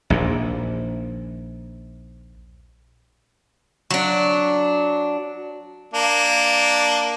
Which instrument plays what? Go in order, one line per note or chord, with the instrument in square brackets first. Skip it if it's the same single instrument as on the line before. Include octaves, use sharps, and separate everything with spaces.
[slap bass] A#1 D#2 A#2
[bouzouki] F#3 D4
[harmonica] A#3 D4